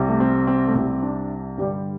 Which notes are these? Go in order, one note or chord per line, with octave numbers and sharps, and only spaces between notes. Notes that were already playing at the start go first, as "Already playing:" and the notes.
Already playing: C2 C3 G3
A3
C4
C4
A3
C2 C3 G3 C4
D4
G2 D3 G3 G4